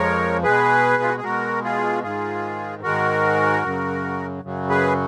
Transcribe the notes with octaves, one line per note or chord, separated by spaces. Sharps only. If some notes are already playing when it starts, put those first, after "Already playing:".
Already playing: F2 F3 G#3 A#4 C#5
B2 G#3 G#4 B4
F4
F#4
G#4
B2 G#3 F#4 A#4
F4 G#4
G#2 D#3 G#3 F4 G#4
G#2 D#3 G#3 F#4 A#4
F#2 C#3 F#3
F#2 C#3 F#3
G#4 B4